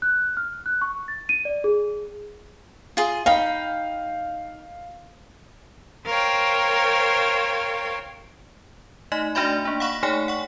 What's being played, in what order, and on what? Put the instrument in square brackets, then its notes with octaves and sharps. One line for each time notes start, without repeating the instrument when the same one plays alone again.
[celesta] F#6
F6
F#6
C#6
A6
D#7
D5
G#4
[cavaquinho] F4 G#4
[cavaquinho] D#4 G5 B5 [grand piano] F5
[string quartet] A#4 C5 C#5 F5 G5
[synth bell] A3 D#4 D#5
A3 D4 F#4 D5 E5 B5
A#3 D4
F5 F#5 B5 C#6 F#6
A3 D#4 G#4 C#5 G5 G#5
F#5 C#6